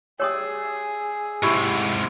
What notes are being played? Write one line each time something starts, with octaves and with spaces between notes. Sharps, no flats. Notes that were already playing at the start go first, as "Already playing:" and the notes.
G4 G#4 C#5 D5 E5 C6 D#6
G#2 C3 E4 G4 C5 C#6